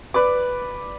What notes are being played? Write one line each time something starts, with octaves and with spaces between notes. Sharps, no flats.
B4 D5 D6